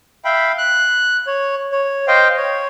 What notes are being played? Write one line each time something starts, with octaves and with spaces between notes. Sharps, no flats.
E5 F5 G5 B5
F#6
C#5
C#5
C5 D#5 F5 G5
C#5